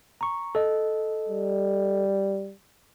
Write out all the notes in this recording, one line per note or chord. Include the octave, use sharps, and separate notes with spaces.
A#5 C#6
A4 D#5
G3